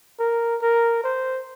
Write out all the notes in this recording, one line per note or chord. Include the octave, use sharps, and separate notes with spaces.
A#4
A#4
C5